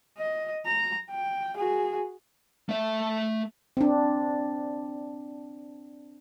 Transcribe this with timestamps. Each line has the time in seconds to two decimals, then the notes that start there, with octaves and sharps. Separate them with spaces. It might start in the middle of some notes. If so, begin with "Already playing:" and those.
0.18 D#5
0.66 A#5
1.11 G5
1.57 F#4 G#4
2.69 A3 E5
3.77 C4 D4